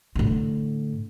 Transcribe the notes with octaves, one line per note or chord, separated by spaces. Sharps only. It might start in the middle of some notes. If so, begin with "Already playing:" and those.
A2 D3